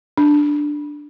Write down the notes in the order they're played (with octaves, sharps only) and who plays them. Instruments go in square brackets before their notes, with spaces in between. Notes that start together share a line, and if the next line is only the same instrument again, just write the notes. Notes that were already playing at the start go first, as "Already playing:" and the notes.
[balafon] D4